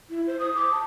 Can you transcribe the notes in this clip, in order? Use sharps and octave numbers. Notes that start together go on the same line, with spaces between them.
E4
C5
D#6
D6
A5